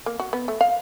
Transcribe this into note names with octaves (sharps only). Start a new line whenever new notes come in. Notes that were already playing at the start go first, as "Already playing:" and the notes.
A#3
F#4
B3
A3
F5